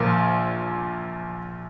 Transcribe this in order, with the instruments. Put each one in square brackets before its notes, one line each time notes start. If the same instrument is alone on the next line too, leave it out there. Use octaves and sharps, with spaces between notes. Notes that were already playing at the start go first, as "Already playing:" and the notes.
Already playing: [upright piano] A#1 A#2 F3 A#3 F4